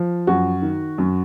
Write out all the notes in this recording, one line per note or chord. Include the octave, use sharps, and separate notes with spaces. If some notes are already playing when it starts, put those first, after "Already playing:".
Already playing: F3
F#2 F#4
D#3
F#2